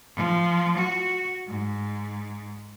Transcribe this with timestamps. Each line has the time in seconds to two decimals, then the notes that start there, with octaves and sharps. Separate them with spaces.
0.16 F3
0.77 F#4
1.47 G#2